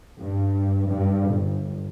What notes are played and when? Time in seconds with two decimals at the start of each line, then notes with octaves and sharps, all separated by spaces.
0.20 G2
0.89 G2
1.30 G1